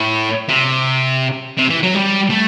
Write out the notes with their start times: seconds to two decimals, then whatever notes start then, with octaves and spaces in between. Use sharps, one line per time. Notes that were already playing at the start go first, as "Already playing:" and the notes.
Already playing: A2
0.48 C3
1.57 C3
1.70 E3
1.83 F#3
1.95 G3
2.30 A3